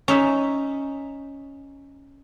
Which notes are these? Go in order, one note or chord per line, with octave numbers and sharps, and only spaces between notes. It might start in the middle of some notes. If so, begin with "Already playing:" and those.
C#4 D#4 E5